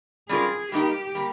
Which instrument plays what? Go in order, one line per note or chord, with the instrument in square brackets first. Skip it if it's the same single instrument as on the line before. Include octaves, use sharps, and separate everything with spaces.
[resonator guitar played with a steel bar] G3 C#4 F4 A#4 [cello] G#4
[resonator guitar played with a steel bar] G3 A#3 D#4 A#4 [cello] G4
[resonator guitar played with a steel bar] G3 A#3